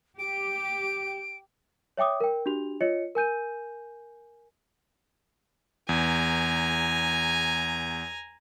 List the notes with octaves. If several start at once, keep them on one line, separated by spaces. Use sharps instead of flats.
G4 D7
C#5 E5 G5 D6 D#6
A#4 G5
D4 F#4 G4 F7
F4 C#5 D#5 C#7
A#4 G#5 G6 D#7
E2 G#5 A#5